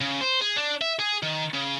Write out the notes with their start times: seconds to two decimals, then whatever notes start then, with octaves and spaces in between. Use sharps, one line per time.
0.01 C#3
0.21 C5
0.41 G#4
0.56 D4
0.81 E5
0.99 G#4
1.23 D#3
1.54 C#3